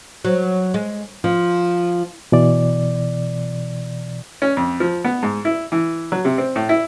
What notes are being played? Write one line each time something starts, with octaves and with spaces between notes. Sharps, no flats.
F#3
G#3
F3
B2 E3 D5
C#4
F2
F3
B3
G#2
E4
E3
F#3
C3
C4
A2
E4